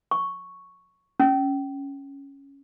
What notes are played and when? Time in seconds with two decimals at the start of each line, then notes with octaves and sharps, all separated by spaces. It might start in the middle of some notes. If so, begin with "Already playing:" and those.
0.11 C#6
1.20 C#4